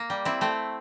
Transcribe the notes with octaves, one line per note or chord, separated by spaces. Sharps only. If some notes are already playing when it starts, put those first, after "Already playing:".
Already playing: A#3
G3
C4 E4
A3 C4